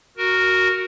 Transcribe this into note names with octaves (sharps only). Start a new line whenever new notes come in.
F#4 A#4